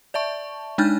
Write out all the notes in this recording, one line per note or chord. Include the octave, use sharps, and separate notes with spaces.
D5 E5 A5 C#6
G#3 D4 D#4 F6 G6 A6